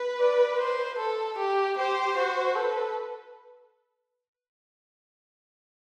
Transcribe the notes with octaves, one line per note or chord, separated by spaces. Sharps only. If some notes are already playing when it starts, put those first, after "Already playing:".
Already playing: B4
D5
C5
A4
G4
G4 C5
F#4
A4 B4